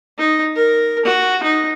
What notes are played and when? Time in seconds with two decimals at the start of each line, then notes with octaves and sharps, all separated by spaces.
0.18 D#4
0.56 A#4
1.05 F#4
1.43 D#4